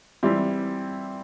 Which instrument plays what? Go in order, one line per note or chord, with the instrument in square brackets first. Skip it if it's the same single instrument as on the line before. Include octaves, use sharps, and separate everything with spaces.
[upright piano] E3 G3 C4 E4 G4